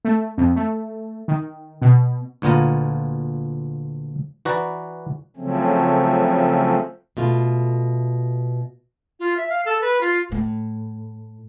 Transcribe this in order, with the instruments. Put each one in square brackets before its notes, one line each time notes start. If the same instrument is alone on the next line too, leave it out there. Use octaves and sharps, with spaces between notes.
[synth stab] A3
F2
A3
D#3
B2
[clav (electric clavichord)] D2 A#2 B3 F4 A#5
E3 F#4 B4 D5 A#5
[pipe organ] C#3 F3 F#3 A3 C4 C#4
[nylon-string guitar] B2 A3 F4
[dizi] F4
E5
F5
A4
B4
F4
[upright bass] A2